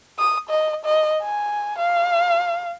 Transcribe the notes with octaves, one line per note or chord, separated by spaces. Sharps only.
D#6
D#5
D#5
G#5
F5